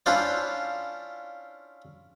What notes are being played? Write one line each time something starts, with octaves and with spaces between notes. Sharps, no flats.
C#4 D4 E4 F4 C5 D5